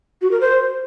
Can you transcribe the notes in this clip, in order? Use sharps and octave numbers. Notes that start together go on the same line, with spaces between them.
F#4
A#4
C5